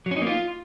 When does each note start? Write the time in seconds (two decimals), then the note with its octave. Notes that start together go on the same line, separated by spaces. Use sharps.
0.06 F#3
0.11 C#4
0.16 D#4
0.22 A#3
0.27 F4